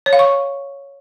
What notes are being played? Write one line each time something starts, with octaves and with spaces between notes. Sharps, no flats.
C#5
F5
C#6